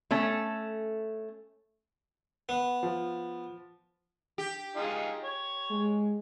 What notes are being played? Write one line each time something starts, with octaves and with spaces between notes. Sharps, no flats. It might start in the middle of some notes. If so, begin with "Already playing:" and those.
A3 C#4 A4
B3
F3
G4
D#4 F4 G#4
C#5
G#3